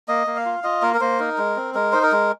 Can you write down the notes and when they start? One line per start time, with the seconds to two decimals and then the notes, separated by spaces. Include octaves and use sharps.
0.08 A#3 D#5
0.27 A#3
0.36 F5
0.45 F4
0.64 F4 D#5
0.82 A#3 A#4
0.94 A#4
1.01 A#3 C5
1.19 D#4 A#4
1.38 G#3
1.56 C4
1.75 G#3 A#4
1.92 D#4 C5
2.03 A#4
2.12 G#3